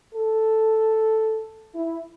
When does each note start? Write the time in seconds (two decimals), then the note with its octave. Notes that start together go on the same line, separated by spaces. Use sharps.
0.14 A4
1.75 E4